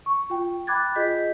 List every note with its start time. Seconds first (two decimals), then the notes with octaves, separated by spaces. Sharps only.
0.06 C#6
0.30 F4 G5
0.67 G5 B5 D6 F#6 G#6 A6
0.95 F4 G#4 D#5 G6 B6